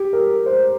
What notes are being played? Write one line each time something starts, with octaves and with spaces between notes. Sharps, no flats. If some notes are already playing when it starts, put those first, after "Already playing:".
Already playing: G4
A#4
C5